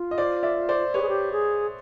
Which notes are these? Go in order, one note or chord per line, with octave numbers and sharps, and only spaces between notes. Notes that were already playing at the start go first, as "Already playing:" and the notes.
Already playing: F4
D#5
C5 D5
D5 E5
C5 D5
G4 B4 C#5
G#4
G4
G#4